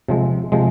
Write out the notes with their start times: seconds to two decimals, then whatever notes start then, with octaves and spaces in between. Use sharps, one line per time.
0.08 C3 F3 G#3
0.52 C3 F3 G#3